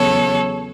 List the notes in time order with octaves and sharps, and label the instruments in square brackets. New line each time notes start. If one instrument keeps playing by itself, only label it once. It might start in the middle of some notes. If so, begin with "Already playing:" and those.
Already playing: [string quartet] E2 C#3 F#3 B3 A4 C#5